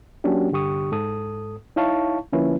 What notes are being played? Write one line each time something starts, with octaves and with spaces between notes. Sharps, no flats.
F#3 A#3 C#4 D4 F#4 G4
C2 G2 D3 G4 C#6 D#6
G#2 A4 D#6
D#4 E4 C#5 F5 A5 C#6
D3 F3 A#3 C#4 E4 B4